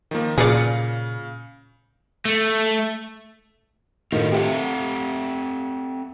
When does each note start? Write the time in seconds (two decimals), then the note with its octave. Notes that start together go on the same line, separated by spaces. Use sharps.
0.11 D#3 F3 A#3
0.38 A#2 C#3 G#4 D5 F5 C#7
2.25 A3
4.12 A2 D#3 F4 F#4 B4
4.32 C4 G4 A4 E5 F#5